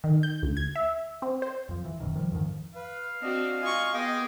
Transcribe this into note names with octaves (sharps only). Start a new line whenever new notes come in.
D#3
G6
D2
G#6
E5
C4
C5
F2 F3
E3
F#1 F#2 B2 D#3
D#3 F3 G3
F2 G#2 D#3 F3
B4 F5
C4 D4 F#4 D#5
F4 D#5 G#5 C#6
B3 G#4 D#5 G5 C6 D6